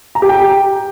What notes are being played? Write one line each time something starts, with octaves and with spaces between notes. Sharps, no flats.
A#5
G4
G5